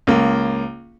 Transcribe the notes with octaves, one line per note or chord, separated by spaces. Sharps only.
C#2 A#3